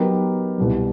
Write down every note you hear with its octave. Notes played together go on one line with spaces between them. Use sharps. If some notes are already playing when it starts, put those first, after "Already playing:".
Already playing: F#3 B3 D#4 G4 A#4
C2 B2 G3